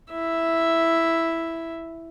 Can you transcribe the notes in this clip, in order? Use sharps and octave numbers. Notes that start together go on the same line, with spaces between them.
E4 E5